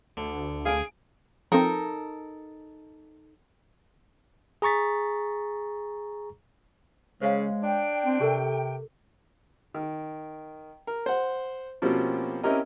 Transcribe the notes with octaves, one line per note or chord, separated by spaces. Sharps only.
D2 D3
G#4 F5 G#5 D7
F3 C4 D#4 A4 A#4
G#4 A#5 C#6 A6 B6
C#3 G#3 C5 C#5 F5
D4 G5
C4
C3 G4 A4 A#4
D#3
A#4
C5 F#5
B2 F3 A#3 C4 C#4 G4
C4 C#4 E4 G4 A#4 D#5